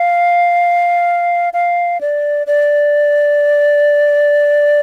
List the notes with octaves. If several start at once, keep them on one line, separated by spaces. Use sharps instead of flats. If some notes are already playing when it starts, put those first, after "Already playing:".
Already playing: F5
F5
D5
D5